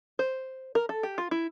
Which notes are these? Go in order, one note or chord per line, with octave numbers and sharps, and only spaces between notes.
C5
A#4
A4
G4
F4
E4